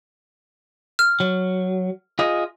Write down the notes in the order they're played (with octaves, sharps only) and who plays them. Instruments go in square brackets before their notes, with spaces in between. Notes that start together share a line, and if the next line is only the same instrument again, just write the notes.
[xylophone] F6
[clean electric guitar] F#3
F4 G#4 D#5